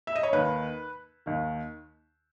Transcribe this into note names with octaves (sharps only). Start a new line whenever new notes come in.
E5
D#5
C#5
D#2 D#3 B4
D#2 D#3